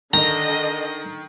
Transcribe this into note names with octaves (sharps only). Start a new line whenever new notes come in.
D3 D#3 D#5 A#5